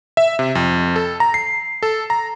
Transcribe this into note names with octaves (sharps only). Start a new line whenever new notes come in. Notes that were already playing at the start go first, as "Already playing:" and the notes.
E5
C3
F2
A4
A#5
C7
A4
A#5